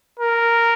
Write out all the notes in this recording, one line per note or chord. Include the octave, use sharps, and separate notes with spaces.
A#4